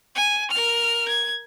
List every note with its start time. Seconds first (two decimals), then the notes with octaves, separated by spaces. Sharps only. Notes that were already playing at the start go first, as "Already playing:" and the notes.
0.15 G#5
0.51 A#4 F6
1.08 G#6